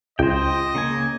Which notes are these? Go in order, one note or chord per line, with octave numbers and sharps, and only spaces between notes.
C#2 C5 D#5 G5
C#3 A#3 G#5